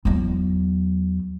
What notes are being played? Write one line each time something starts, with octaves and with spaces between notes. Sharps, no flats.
E2 F#3